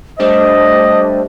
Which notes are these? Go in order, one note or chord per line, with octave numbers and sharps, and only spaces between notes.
G3 A3 D4 C5 D#5